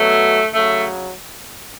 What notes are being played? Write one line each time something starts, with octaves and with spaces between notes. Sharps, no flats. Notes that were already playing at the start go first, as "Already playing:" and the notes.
Already playing: B2 F#3 A3
C#3 F#3 A3